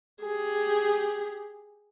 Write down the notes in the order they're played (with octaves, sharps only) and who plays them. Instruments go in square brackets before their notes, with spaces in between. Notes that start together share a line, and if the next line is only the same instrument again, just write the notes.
[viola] G4 G#4